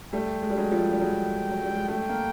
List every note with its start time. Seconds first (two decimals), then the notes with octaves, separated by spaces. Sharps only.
0.13 G3 A3 G5
0.42 G#3
0.50 G3
0.57 F#3 G#3
0.71 F3 G3
0.92 G3
1.01 F#3 G#3
1.50 F#3
1.63 G3
1.76 G#3
1.88 G3 A3 G5
2.09 A#3